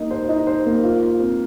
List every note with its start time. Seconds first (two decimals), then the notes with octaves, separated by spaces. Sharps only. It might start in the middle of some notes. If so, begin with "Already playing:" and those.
Already playing: A#3 D#4
0.11 C5
0.29 D#4
0.47 C5
0.66 A#3
0.83 F4
1.01 F4
1.20 C4